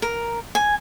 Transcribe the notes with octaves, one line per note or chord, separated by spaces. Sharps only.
A#4
G#5